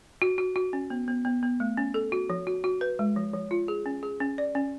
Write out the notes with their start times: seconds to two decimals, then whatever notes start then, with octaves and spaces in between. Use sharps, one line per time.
0.22 F#4
0.38 F#4
0.56 F#4
0.73 C#4
0.90 B3
1.08 B3
1.25 B3
1.43 B3
1.60 A3
1.77 C#4
1.94 A4
2.12 F#4
2.30 F3
2.47 F#4
2.64 F#4
2.81 B4
2.99 G#3
3.16 F3
3.33 F3
3.51 F4
3.68 G#4
3.86 C#4
4.03 G#4
4.20 C#4
4.38 D5
4.55 C#4